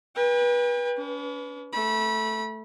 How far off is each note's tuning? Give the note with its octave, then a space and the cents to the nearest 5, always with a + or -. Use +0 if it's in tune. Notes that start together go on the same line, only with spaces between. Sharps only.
B4 -30 G5 +40
C#4 +45 B4 +0
A3 +0 B5 -30